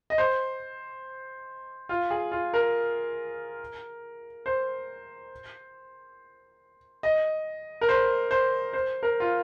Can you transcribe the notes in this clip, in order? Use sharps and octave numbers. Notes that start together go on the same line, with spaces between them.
D#5
C5
F4
G#4
F4
A#4
C5
D#5
A#4
C5
C5
C5
A#4
F4